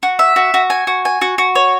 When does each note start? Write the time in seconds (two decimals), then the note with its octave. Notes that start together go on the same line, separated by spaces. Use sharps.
0.03 F#4
0.19 E5
0.36 F#4
0.54 F#4
0.70 G#5
0.87 F#4
1.05 G#5
1.21 F#4
1.38 F#4
1.55 C#5